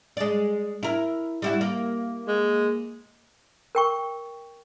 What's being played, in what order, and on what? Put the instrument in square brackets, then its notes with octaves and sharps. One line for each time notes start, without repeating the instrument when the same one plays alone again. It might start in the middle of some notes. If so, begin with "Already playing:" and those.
[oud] G#3 D5
E4 A#4
G3 E4 F#4
A#3
[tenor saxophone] G#3
[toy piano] A#4 G5 C#6